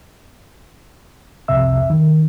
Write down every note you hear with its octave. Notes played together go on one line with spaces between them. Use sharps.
C2 F2 C3 E5 E6
D#3